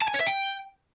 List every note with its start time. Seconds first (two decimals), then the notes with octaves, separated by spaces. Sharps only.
0.01 A5
0.08 G#5
0.14 C#5
0.20 E5
0.27 G5